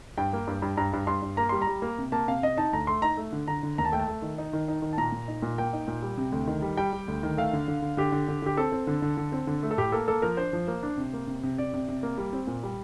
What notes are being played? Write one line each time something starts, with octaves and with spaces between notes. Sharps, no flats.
G2 G5
A#3
G2
G2
G2 A#5
G2
G2 C6
G2
A#3 A#5
G3 C6
A#5
G3
A#3
C3
A#3 A5
C3 F5
C3 D#5
D#4 A5
D2 A#5
A3 C6
D#4 A#5
A3
D3
D3 A#5
D3
D#2 A#5
A5
A3 G5
A5
A3
D#3
D#4
D#3
D#4
D#3
A5
A#2 A#5
A#2
D#4
A#2
A#3 G5
D#4
A#2
G3
C3
D2
D#3
G3
G3 G5
G3
D2
D#3
A3 F5
D3
D3
D3
D3 G4
D3
D3
D3 G4
C4 A4
C4
D3
D3
D3
C4
D3
A3
A4
A2 G4
A#3 A4
A#3 A4
F3 A#4
D4 C5
F3
A#3
D4
C3
A#3
C3
C3
C3 D5
C3
C3
A#3
G3
C4
A#2
G3